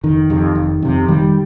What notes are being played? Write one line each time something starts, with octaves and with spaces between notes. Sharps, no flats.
F1 D#3
F2 C3
F1
F2 C3
F1 D#3 G3